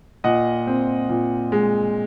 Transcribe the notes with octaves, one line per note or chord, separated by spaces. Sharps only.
A#2 D#5 F#5
C4
A#2
G#3